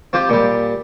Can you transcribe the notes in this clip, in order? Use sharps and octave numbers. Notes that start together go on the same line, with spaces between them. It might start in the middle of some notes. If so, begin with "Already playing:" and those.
C4 F4 G4
A#2 G3